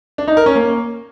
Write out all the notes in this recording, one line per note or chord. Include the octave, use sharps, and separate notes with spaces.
D4
D#4
A#4
C#4
A#3